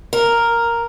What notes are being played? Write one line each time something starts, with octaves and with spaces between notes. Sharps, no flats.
A#4